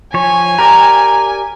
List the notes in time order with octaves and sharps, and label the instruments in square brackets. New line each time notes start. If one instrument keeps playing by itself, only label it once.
[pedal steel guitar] F3 C#5 [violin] G#5
[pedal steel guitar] G4 A#4 D5 [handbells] A#5